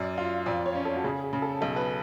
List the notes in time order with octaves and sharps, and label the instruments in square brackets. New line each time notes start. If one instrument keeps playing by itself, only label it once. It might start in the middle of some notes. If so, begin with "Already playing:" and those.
Already playing: [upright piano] F#2 [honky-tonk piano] D5
[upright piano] F4 [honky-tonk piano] F5
[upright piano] F2 [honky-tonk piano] D5
[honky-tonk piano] C#5
[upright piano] C#4
[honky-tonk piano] A4
F#4
[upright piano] C#3 [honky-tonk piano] G#4
[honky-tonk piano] G#4
[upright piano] C#3
[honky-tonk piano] A4
[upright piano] B1 [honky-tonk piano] A4
[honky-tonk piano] B4